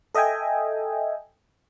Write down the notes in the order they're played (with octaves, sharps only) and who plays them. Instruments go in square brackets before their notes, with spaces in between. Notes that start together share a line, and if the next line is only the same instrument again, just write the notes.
[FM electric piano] A4 D#5 E5 G5 G#5